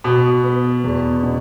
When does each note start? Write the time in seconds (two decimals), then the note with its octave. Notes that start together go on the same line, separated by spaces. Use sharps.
0.04 B2 B3
0.44 B3
0.84 E2
1.23 B2